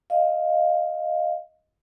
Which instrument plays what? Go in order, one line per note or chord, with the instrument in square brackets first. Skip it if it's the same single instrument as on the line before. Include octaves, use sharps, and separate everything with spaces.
[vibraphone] D#5 F5